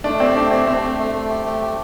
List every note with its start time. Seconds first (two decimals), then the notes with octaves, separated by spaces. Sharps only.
0.04 A3 D4
0.20 C4 G4
0.36 A3 D4
0.51 C4 G4
0.67 A3 C4
0.82 A3
0.99 A3
1.14 A3
1.30 G4
1.45 A3
1.61 G4